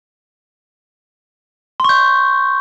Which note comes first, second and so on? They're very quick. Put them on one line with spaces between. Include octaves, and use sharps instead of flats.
C6 C#6 G6